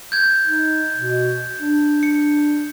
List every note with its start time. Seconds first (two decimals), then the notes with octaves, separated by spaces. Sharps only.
0.12 G6 G#6
0.47 D#4
0.96 B2
1.59 D4
2.03 C#7